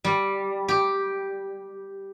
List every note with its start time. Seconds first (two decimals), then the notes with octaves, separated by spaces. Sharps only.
0.05 G3
0.68 G4